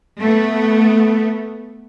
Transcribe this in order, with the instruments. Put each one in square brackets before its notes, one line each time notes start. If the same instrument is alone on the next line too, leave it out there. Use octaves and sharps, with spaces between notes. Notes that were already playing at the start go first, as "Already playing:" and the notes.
[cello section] A3 B3